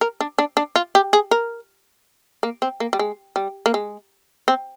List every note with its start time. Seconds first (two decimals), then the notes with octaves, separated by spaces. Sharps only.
0.01 A#4
0.21 D4
0.38 D4
0.57 D4
0.76 F4
0.95 G4
1.13 G#4
1.31 A#4
2.43 A#3
2.62 C4
2.80 A#3
2.93 G3
2.99 G#3
3.36 G3
3.66 A#3
3.74 G#3
4.48 C4